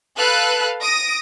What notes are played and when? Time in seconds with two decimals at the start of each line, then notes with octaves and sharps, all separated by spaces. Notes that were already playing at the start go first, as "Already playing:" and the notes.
0.15 A4 B4 F5 F#6
0.80 D#6 A#6 D7